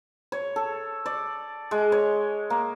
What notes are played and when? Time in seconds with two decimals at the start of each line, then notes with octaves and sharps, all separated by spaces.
0.32 C#5
0.56 A4
1.06 D5
1.71 G#3
1.92 C#5
2.50 A#3